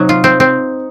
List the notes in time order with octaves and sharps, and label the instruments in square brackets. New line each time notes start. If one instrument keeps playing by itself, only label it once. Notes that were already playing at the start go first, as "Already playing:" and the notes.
Already playing: [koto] C3 F#3 [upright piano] D#4
[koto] F4
C4
C4